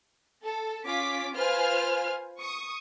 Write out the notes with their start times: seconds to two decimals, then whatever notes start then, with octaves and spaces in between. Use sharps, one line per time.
0.43 A4
0.85 C#4 F4 D6 B6
1.34 F4 B4 C5 G#5 F6
2.39 C#6 D#6